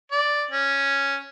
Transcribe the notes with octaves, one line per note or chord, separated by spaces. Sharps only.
D5
C#4